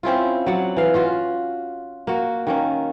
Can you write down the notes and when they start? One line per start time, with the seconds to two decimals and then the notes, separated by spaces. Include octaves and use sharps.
0.03 C4 C#4 E4 F4
0.46 F#3 D5 F#5
0.76 E3 F5
0.94 C#4 F4 F#4
2.07 A#3 F#4
2.47 D#3 A#3 C#4